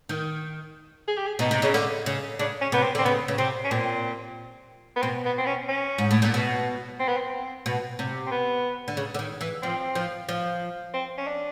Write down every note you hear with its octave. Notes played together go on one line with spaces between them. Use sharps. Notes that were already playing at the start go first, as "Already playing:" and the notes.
D#3
G#4
G4
G#4
B2 D#4
C3
C#3
D3
C#3
C#3 D4
C#4
C3 B3
C4
D3 C4
C#3 B3
C#3
C3 C4
C#4
A#2 C4
B3
B2 C4
B3
C4
C#4
C#4
G#2
A2
A#2
B2
C4
B3
C4
B2
C3
C4
B3
D3
C#3
D3
D#3
E3
F3 C4
F3
F3
C4
C#4
D4